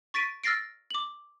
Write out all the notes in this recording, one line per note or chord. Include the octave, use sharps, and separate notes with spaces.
C#6 A6 B6 D7 D#7
E6 F6 A6 A#6 C7 D7
D6 F#7